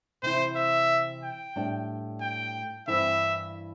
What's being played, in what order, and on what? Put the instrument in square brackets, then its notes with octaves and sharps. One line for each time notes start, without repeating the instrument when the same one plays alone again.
[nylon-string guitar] C3 E3 C4 E4 [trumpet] C5
[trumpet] E5
G5
[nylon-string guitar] A2 G3 D4
[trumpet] G5
[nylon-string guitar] G2 E3 C4 E4 [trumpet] E5